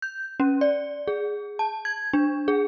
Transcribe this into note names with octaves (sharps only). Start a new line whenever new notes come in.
G6
C#4
D5
G#4
A5
G#6
D4
G#4